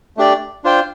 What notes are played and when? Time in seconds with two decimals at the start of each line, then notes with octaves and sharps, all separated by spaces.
0.17 A3 D4 G4 D5
0.64 D4 F4 C5 G5